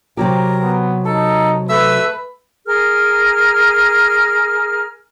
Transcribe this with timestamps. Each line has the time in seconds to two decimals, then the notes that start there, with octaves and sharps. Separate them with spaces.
0.17 C3 F#3 G4 A#4
0.60 B3
1.05 D#4 A4
1.69 A3 B4 E5 E6
2.65 G#4 A#4 F6